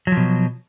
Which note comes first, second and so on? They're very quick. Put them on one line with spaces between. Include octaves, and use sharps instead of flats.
F#3 F3 B2